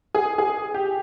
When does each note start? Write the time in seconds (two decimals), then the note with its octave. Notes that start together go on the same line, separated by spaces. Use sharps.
0.15 G#4
0.38 G#4
0.74 G4